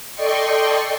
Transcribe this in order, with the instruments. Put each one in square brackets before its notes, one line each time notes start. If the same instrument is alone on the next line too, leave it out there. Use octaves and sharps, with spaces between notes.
[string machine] A4 D5 D#5 G5 C6 C#6